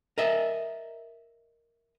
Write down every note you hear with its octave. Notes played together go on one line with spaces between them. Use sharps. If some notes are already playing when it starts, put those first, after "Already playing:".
A#4 D#5 E5